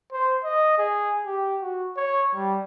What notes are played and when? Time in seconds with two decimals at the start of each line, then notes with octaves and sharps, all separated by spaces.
0.12 C5
0.44 D#5
0.78 G#4
1.26 G4
1.61 F#4
1.97 C#5
2.34 G3